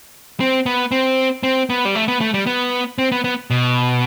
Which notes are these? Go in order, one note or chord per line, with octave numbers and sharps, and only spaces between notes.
C4
B3
C4
C4
B3
G3
A3
B3
A3
G3
B3
C4
B3
B3
B2